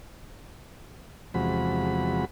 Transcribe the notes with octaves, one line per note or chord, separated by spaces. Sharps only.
E2 C3 F3 G#3 F#4 B5